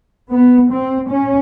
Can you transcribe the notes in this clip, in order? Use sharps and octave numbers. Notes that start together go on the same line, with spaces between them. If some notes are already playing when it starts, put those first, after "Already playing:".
B3
C4
C#4